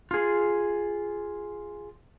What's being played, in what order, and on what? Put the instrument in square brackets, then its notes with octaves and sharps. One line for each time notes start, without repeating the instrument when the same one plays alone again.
[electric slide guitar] F4 G#4